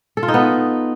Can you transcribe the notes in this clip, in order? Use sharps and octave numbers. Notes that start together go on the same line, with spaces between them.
A4
F4
D#4
B3